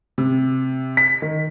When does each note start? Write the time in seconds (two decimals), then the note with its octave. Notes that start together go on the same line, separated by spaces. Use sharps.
0.18 C3
0.97 B6
1.22 D#3